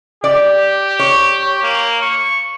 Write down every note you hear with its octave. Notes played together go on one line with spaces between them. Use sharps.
G4 D5
C#5
A#3
C#6